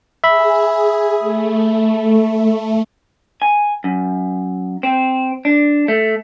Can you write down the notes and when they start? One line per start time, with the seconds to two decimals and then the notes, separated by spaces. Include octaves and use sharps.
0.24 G#4 E5 B5
1.19 A3
3.42 G#5
3.84 F#2
4.83 C4
5.45 D4
5.88 A3